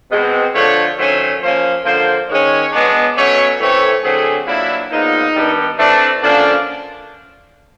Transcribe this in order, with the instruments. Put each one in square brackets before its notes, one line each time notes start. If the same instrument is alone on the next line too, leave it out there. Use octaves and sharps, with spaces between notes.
[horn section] B2 G#3 C4
D3 F3 A3 D4 C#5
D#3 F#3 A3 C#4 C5
F3 A#3 C#4 C5
D3 F3 A#3 C5
D#3 G#3 C#4 C#5
B2 G#3 B3 D4
B2 F#3 A3 C#4 C#5
A2 E3 A3 C4 C#5
D3 F#3 A3 C4 G#4
A#2 F#3 A#3 D4 E4
A#2 F3 G#3 B3 D#4
D#3 G3 B3 D4
E3 A3 C4 D4
D3 F3 A#3 C#4 D4